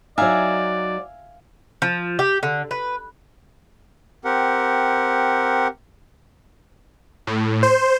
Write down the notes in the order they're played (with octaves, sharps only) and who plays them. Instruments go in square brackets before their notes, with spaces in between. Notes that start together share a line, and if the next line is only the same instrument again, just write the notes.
[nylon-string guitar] F#3 D#4 [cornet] D5 [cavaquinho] E5 F5 G#5
[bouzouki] F3
G4
D3
B4
[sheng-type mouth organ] C4 G4 A#4 F#5
[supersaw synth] A2
C5